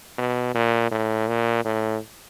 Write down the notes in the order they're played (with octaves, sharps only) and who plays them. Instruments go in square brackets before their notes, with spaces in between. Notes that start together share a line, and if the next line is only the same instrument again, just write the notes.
[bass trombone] B2
A#2
A2
A#2
A2